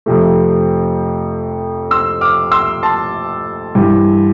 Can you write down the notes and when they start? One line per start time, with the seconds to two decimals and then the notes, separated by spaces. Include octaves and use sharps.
0.06 F2 C3 F3 A3
1.91 C6 E6
2.21 D6 F6
2.51 C6 E6
2.83 A5 C6
3.75 G2 E3 G3